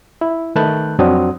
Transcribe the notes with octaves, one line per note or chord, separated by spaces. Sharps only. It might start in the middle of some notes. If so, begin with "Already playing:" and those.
E4
D#3 A3 B4 A5 F#6 G6
F2 F#3 C4 D4 F#4 D#6